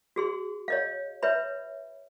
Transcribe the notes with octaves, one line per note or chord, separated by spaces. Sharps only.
F#4 G#4 C6
C#5 D#5 F5
B4 C#5 E5 B5